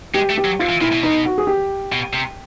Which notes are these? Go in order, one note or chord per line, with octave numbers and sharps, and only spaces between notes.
G#3 G4
A3
G4
F#3
F4
E3
A#2 E4
B2
D#4
F#4
G#4
G4
B2
C3